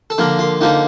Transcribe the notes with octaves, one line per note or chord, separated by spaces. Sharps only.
A4
D3 F3 A#3 A#4
F4
D3 F3 A#3 D#4